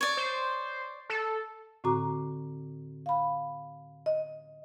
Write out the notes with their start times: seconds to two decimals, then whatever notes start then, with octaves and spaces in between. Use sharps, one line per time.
0.01 C#5 D5
0.17 C5
1.10 A4
1.84 A2 D3 C4 F#4 A#5 D6
3.06 F5 B5
4.06 D#5